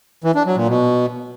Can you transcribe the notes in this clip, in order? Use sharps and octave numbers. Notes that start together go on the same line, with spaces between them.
E3
D4
F#3
A#2
B2